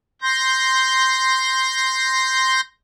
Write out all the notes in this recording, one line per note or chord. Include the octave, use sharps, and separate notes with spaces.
C6 G6 A#6